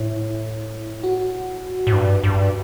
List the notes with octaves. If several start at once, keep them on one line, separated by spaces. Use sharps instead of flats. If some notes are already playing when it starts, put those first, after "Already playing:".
Already playing: A2 E4
F#4
A2
G2
G2